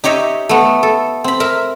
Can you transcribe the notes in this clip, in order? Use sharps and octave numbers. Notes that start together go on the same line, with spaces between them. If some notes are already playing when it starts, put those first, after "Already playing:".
D#4 G4 C#5 D#5 E5
A3 B3
A4
C4 B5
A#4 E5